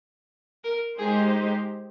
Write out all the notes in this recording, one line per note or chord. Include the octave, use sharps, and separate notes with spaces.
A#4
G#3 D#4 G4 G#4 C5